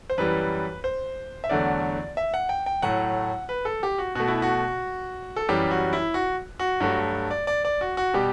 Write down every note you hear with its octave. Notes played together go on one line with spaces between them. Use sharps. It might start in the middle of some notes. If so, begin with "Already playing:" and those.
C5
F#2 E3 G3 B4
C5
E5
E2 D3 F#3 A3 D5
E5
F#5
G5
G5
A2 F#3 A3 F#5
B4
A4
G4
F#4
B2 A3 F#4
E4
F#4
A4
F#2 E3 G3 G4
F#4
E4
F#4
F#4
G2 F#3 A3 F#4
D5
D5
D5
F#4
F#4
B2 G3 G4